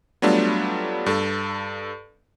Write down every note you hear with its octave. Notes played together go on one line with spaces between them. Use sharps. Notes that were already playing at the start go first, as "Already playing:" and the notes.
F#3 G3 A3 B3 D4 F4
G2 A4